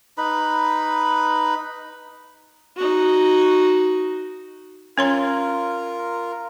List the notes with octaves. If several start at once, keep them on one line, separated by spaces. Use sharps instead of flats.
D#4 B4 B5
D#4 F#4
C#4 F4 A#4 C#5 C6